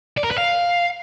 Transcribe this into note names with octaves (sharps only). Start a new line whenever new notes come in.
D5
A#4
B4
F5